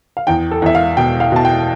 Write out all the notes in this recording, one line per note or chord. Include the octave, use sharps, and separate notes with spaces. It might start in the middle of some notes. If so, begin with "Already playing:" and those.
F5
E2 G5
A4
E2 E5
F5
B2 G5
F5
B2 A5
G5